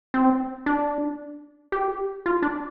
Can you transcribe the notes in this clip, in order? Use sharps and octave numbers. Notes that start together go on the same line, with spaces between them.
C4
D4
G4
F4
D4